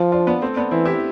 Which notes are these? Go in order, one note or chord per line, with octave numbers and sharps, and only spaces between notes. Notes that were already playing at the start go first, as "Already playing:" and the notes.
Already playing: F3 F4
D4 F4
B3 D4
A3 C4
B3 D4
E3 C4 E4
E4 G4